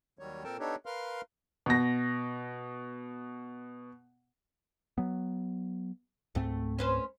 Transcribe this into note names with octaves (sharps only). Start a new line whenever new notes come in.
D#2 D#3 F#3 G3 C#5
A#2 C4 A4 A#4 G5 A5
B3 D4 D#4 G4 A4 C#5
A#4 B4 F5 C6 F6
B2 A#6
F#3 B3
C#2 G#2 A3 C4
C#4 B4 C5